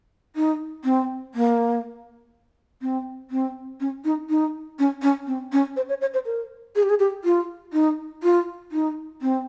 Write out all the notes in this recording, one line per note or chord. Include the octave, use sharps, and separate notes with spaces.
D#4
C4
A#3
C4
C4
C#4
D#4
D#4
C#4
C#4
C4
C#4
C5
C#5
C#5
C5
A#4
G#4
G4
G#4
G4
F4
D#4
F4
D#4
C4